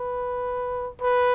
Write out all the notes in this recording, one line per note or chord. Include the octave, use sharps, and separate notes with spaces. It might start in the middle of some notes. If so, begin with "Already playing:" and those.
Already playing: B4
B4